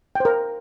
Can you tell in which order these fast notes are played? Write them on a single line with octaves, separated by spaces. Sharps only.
G5 C5 A#4